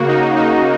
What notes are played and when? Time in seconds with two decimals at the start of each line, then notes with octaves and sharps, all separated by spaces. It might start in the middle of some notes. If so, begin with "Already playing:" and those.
Already playing: C#3 A#3 F#4
0.08 D#4
0.36 D#4